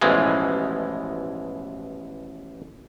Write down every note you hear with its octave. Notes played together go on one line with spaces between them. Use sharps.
A1 B2 E3 F3 G#3